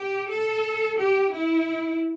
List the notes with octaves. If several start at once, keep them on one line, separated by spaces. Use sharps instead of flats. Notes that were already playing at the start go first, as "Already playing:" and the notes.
Already playing: G4
A4
G4
E4